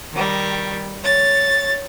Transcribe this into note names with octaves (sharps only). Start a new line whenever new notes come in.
D#3 G3
C#5 A6